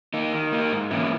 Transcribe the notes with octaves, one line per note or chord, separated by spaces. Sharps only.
A#3 D#4
D#3
A#3 D#4
G#2
E3 A#3 C#4 E4